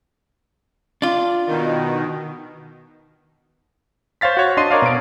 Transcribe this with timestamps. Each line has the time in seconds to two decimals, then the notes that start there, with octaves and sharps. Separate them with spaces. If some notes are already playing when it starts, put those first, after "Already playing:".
1.02 D4 F4
1.47 B2 D#3
4.21 C5 C#5 F5 A6 B6
4.37 F#4 C#5
4.57 D4 D#5 C6 C7 D#7
4.70 A#4 C#5 D5 F5
4.82 B2 D7